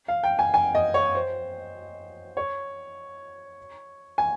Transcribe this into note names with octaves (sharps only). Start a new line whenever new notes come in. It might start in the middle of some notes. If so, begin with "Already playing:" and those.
F5
G5
G#5
G#5
D#5
C#5
C5
C#5
G#5